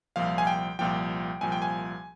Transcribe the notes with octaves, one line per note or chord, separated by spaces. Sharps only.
C2 A#2 F3 F5
G#5
G5
C2 A#2 F3 G5
C2 A#2 F3 G#5
G5
G#5